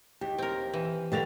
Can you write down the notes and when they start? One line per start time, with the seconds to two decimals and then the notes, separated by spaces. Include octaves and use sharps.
0.21 D#2 G4
0.38 C4 A#4
0.74 E3
1.12 B2 D3 A#3 G4 A6 F7